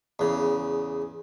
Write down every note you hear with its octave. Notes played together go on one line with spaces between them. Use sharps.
E2 C#3